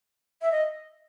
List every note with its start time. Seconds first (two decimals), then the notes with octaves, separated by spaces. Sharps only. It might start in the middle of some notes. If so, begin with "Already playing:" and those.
0.42 E5
0.52 D#5